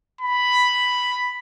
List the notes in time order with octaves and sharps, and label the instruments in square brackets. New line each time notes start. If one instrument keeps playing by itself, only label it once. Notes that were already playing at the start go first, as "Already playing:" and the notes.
[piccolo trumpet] B5